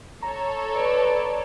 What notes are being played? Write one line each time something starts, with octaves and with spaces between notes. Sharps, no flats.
A4 C#5 A#5
B4 D5